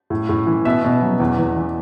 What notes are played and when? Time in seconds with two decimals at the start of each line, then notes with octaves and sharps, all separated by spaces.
0.10 A2
0.29 A2
0.47 E3
0.65 B2 E5
0.84 B2
1.02 F#3
1.20 E2
1.38 E2
1.56 E3